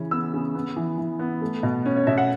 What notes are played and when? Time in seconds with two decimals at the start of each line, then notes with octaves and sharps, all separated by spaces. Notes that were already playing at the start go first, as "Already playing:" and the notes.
Already playing: C#3 E3 C#4
0.11 B3 E6
0.33 C#3
0.55 B3
0.76 E3
0.98 E3
1.19 B3
1.42 A3
1.63 B2
1.86 C#4
1.96 C#5
2.07 B2 E5
2.18 F#5